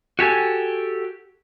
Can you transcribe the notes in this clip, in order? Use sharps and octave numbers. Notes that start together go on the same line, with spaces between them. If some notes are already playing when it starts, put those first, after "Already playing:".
F#4 G4 A4 G#5